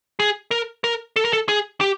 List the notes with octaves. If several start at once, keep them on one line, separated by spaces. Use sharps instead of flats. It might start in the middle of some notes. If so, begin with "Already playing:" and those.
G#4
A#4
A#4
A4
A#4
A4
G#4
G4